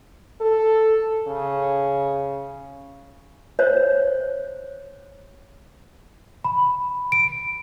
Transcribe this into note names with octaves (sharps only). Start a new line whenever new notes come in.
A4
C#3
C5 C#5
B5
D7